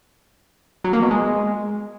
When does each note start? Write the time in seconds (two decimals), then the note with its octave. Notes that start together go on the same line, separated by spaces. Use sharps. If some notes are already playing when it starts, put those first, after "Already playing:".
0.84 F#3
0.93 A#3
1.02 B2
1.11 G#3